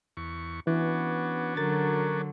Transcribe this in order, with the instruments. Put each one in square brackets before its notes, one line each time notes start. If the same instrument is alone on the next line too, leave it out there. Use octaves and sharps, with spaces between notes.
[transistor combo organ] E2 C#6
[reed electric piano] E3 [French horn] B3 [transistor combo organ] C#4 D4 F#4
[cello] D3 F#3 [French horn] A#4 [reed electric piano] A6